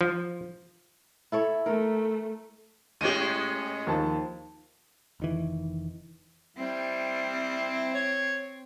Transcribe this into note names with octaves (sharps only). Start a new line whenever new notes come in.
F3
E4 A4 C#5
A3 A#4
A2 G#3 C#4 G4 D#7
D#2 F3 A5
F1 D#3 E3
G3 C4 E4
C#5